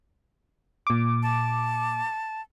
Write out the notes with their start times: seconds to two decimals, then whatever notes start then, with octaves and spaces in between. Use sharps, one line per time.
0.87 A#2 D6
1.23 A5